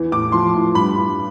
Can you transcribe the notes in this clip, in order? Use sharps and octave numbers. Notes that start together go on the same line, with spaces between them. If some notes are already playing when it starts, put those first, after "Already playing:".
Already playing: E2 E3
A2 D6
F3 C6
A2
G2 B5
G2